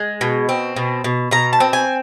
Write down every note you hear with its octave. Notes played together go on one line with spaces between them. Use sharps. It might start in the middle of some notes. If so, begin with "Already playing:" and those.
Already playing: G#3
B2
C4
B2
B2
B2 A#5
A5
C4
G#5